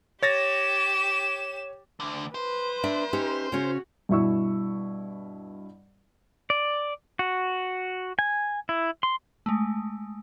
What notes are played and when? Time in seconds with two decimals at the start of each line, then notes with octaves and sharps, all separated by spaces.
0.23 G4 C#5 A6 A#6 E7
2.00 D2 D3
2.35 B4 C5
2.83 D4 E5
3.13 C#4 D#4 G4
3.52 C#3 C#4 F#4
4.09 G2 B2 E4 C#6 E6
6.50 D5
7.19 F#4
8.19 G#5
8.69 E4
9.03 C6
9.46 G#3 A3